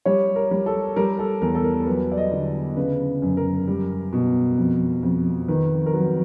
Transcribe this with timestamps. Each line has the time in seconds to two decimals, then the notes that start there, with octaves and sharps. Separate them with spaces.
0.05 G3 C#5
0.36 A#4
0.51 G3
0.66 A4
0.96 G3 A#4
1.19 A4
1.42 E2 A#4
1.55 A4
1.64 A#4
1.87 F#3 B4
2.12 D5
2.17 D#5
2.32 D3
2.77 C#3 B4
3.22 F#2
3.37 A#4
3.68 G3
4.13 B2
4.58 F2
5.03 F2
5.48 D#3 B4
5.86 A#4
5.93 F#3 B4